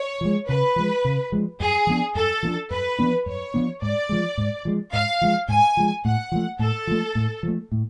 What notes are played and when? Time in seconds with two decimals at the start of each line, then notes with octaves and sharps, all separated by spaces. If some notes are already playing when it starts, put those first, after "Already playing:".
Already playing: C#5
0.21 F3 G#3
0.48 C#3 B4
0.76 F3 G#3
1.05 C#3
1.32 F3 G#3
1.60 F#2 G#4
1.87 F3 B3 D4
2.15 F#2 A4
2.43 F3 B3 D4
2.70 F#2 B4
2.99 F3 B3 D4
3.26 F#2 C#5
3.54 F3 B3 D4
3.82 G#2 D5
4.09 F3 G#3
4.38 G#2
4.65 F3 G#3
4.93 G#2 F5
5.21 F3 G#3
5.48 G#2 G#5
5.77 F3 G#3
6.04 A2 F#5
6.32 F3 A3
6.59 A2 A4
6.87 F3 A3
7.15 A2
7.43 F3 A3
7.72 A2